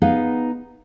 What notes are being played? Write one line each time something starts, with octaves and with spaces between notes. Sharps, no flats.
B3 D#4 G#4 B4 F5